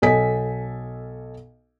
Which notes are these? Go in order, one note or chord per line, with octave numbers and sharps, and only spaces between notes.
B1 A4 D#5 G#5 B6